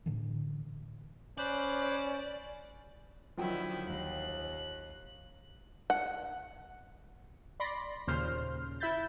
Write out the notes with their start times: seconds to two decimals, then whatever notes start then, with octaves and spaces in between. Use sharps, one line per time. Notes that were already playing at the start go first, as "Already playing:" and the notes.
0.06 A2 D3 E3
1.38 C#4 C5 D5 B5 F#6
3.37 D3 D#3 F3 F#3 E4 G5
3.86 D#2 F#6
5.90 F#5
7.60 D5 B5 C6 A#6
8.07 D#2 A#2 C#3 C5 C6 F6
8.80 E4 E5 B5 G6 A6